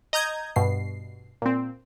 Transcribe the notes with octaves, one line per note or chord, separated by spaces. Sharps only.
D#5 A#5 D#6 G6 G#6
G2 B2 C7
A#2 C4